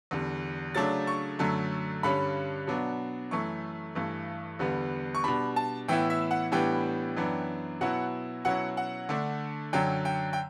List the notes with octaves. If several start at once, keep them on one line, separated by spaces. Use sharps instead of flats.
E2 D3 G3
C#3 F#3 A3 D4 A6
C#6
F#2 D3 F#3 A3
G2 D3 G3 C#4 B5
B2 F#3 B3 D4
F#2 E3 A3 C#6
G2 E3 A3
E2 D3 G3 B3
C#6
B2 G3 D4 B5
A5
A2 E3 B3 E4 G5
E5
F#5
A2 E3 G3 B3 D4 G5
F#2 E3 B3 D4
B2 F#3 B3 E4 F#5
B2 F#3 C#4 E4 F#5
F#5
D3 A3 D4
F#2 D3 F#3 G5
G5
G5